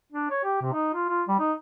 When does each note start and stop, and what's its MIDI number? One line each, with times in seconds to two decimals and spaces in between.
0.12 0.30 62
0.30 0.43 73
0.44 0.57 67
0.61 0.72 48
0.73 0.90 63
0.94 1.08 65
1.09 1.23 65
1.28 1.36 55
1.40 1.52 63